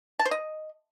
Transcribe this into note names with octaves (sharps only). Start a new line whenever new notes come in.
A5
C5
D#5